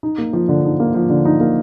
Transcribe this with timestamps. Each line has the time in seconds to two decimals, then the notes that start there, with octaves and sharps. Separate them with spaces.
0.03 D#4
0.18 A#3
0.33 F3
0.49 D3
0.64 D#4
0.80 A#3
0.94 F3
1.10 D3
1.25 D#4
1.40 A#3